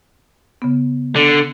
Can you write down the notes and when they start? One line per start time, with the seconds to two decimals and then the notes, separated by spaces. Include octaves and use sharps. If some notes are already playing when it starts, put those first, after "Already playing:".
0.62 C#3 B3
1.16 D3